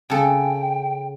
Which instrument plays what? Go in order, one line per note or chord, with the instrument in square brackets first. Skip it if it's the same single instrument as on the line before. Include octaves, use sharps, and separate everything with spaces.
[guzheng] C#3 A4 [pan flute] G5